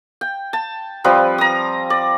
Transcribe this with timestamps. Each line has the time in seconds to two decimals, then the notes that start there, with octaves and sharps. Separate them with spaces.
0.21 G5
0.53 A5
1.04 F3 G3 C4 B4
1.38 A#5 D#6
1.90 D5